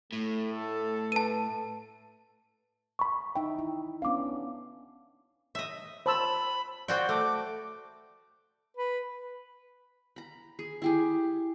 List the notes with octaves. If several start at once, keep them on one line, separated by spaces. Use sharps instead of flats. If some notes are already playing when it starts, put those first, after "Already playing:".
A2 A3
A4
B4 A5 D#7
B5 C#6
D#4 E5 G5
E4
B3 C#4 D4 F5 D6
D#5 E5
C5 A5 B5 E6
C4 F#4 D5 G5
A3 D6
B4
A#5 B5
G#4
E4 G4 G#4